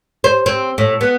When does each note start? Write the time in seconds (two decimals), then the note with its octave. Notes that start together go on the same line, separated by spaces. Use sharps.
0.24 C5
0.46 C4
0.78 A2
1.01 B3